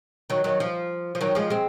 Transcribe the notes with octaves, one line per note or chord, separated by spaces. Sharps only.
D#3 F#3
D#3 F#3
F3
F3
D#3 F#3
F3 G#3
G#3 C4